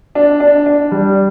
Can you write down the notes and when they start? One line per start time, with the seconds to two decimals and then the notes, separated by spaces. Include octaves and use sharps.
0.15 D4
0.40 D4
0.66 D4
0.92 G3